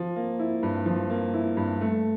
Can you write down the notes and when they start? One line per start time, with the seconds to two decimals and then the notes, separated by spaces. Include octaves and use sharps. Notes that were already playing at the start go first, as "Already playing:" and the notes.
Already playing: F3
0.16 A#3
0.40 E4
0.63 G2
0.86 F3
1.10 A#3
1.34 E4
1.57 G2
1.81 A3